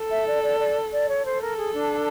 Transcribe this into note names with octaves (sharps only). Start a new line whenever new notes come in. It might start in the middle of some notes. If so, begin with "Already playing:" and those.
Already playing: A4
E5
D5
D5
D5
D5
C#5
A4 C5
A#4
G#4
D4